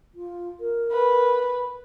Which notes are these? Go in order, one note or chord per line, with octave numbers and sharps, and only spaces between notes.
F4
A#4
B4